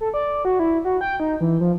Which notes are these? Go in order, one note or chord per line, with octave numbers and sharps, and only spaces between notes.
A4
D5
F#4
E4
F#4
G5
D#4
E3
F3